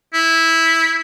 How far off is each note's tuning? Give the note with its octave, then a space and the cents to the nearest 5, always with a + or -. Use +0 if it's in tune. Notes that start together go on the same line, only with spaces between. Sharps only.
E4 -10